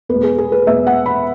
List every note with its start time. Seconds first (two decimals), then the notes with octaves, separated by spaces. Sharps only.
0.09 E2 B2 G#3 B4
0.23 G#4
0.38 G#4
0.52 B4
0.66 E2 B2 G#3 E5
0.87 F#5
1.06 B5